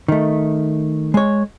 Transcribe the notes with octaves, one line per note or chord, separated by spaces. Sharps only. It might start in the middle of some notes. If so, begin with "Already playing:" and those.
D#3 A3
G#3 C#5